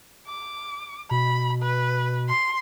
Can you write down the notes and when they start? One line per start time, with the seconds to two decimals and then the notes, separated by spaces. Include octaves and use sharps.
0.27 D6
1.11 B2 B5
1.63 B4
2.29 C6